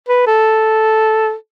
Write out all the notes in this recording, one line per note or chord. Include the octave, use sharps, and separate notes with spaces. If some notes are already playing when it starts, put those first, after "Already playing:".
B4
A4